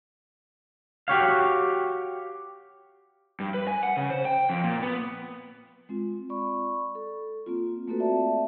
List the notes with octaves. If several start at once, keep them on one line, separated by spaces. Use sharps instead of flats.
F#4 G4 C#5 F5
G2
B4
G#5
F#5
C#3
C5
G5
F2
A#2
B3
G#3 C4 F4
D5 B5 C#6
A4
A#3 C4 F4
A3 A#3 C4 F#4 A4 B4
D5 E5 A5